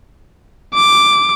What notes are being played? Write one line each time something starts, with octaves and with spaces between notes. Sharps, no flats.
D6